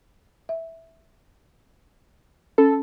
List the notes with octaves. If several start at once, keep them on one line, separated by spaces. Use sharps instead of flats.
E5
C#4 A4